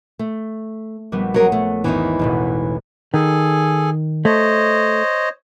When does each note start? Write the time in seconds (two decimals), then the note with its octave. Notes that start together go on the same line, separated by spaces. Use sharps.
0.19 A3
1.12 A#1 G3 B3
1.34 F#3 G#4 A#4 C#5 F#5
1.52 A3
1.84 G#1 E2 E3 B3 D#4
2.19 E1 A1 B2
3.14 D#3 G#4 A4 G#5
4.25 A3 C5 C#5 D#5